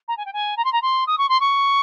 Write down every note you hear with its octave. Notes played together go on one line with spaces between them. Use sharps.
A#5
G#5
G5
G#5
A#5
C6
A#5
C6
D#6
C#6
C6
C#6